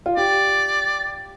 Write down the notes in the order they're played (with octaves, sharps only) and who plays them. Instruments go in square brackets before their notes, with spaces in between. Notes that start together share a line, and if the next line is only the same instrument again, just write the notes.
[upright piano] F4
[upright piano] G4 [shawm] D5